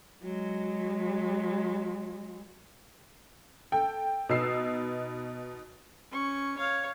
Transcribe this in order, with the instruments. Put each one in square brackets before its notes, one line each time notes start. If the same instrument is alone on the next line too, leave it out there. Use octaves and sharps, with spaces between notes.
[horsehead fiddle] F#3 G#3
[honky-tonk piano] A4 G5
B2 B3 D#4 E6 C7
[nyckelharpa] C#4 C#6
C#5 F5